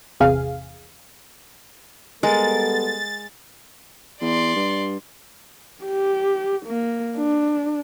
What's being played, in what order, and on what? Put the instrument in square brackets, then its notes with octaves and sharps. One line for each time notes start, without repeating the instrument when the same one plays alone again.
[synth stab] G#1 E2 C3 G#4 F5
[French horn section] G3 B3 A4 [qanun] G#3 A#4 [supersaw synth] A6
[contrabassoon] E2 [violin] D5 C6
[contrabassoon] G2
[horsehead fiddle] G4
A#3
D4